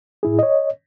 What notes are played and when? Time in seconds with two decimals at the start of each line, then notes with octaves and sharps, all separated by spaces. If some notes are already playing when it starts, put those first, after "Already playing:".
0.23 A2 E4 G#4
0.39 C#5 D#5